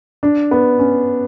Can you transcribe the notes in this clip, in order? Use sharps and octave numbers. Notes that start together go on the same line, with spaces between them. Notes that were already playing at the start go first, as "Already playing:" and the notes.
D4
B3
C#4